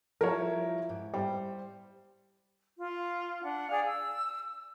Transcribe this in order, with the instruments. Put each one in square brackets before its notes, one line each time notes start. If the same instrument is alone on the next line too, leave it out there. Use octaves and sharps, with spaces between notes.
[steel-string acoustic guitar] F3 G3 E4 [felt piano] A#4 C#5
[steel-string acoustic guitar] G#2
[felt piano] G3 [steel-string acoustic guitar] C5
[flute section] F4
D4 F#5
G#4 D5 F5
E6